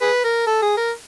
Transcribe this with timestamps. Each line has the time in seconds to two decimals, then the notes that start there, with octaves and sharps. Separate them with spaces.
0.02 G#4 B4
0.24 A#4
0.47 A4
0.62 G#4
0.77 A#4